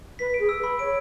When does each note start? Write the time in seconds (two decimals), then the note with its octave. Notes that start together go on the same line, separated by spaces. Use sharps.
0.19 B4 B6
0.34 G#4 D7
0.49 E6
0.59 B4
0.64 B5
0.79 C#5 D7